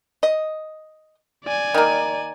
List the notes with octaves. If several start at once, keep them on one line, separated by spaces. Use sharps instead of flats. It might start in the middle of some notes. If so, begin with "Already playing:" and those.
D#5
D5 G#5
D#3 A#3